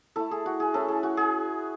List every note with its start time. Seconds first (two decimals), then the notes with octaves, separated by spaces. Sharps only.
0.16 A3 E4 A4
0.31 G#4
0.46 F#4
0.60 G#4
0.74 A3 C#4 E4 A4
0.88 G#4
1.03 F#4
1.17 G#4